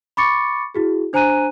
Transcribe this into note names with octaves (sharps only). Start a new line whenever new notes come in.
B5 C#6 D6 A6 C#7
E4 F#4 G#4
D4 C5 G#5 A#5 F#6 D#7